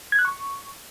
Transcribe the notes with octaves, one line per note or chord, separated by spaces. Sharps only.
G#6
F#6
C#6